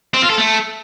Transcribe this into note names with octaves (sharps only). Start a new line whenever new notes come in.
C4
F4
A4
A3